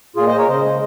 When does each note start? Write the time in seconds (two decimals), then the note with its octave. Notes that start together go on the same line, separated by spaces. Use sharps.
0.16 A#2 F4 G#4
0.27 C5 D#5
0.32 G#3
0.38 A#4 C#5
0.48 C#3 C5 D#5
0.64 G#3